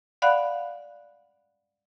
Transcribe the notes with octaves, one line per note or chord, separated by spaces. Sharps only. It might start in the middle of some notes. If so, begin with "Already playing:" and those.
D5 F5 F#5 B5 F#6